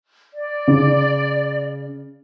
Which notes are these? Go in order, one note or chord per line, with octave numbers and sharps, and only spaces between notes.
D5
C#3